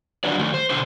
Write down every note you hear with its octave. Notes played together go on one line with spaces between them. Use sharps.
D#3 F#3 D4 F#4 B4 D5
D#3 A3
C5
B2 D3 D4 C5